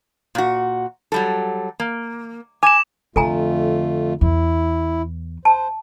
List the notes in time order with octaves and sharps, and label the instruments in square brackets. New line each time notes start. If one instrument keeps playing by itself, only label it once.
[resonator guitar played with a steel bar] A#2 F#4
F#3 G3 A4
A#3
[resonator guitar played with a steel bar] G#5 [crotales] D6 E7
[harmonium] F2 A3 F4 [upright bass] D3 [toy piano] A4 G#5 A#5
[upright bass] E2 [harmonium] E4
[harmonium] C5 [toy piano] A5